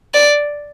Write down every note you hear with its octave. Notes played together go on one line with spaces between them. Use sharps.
D5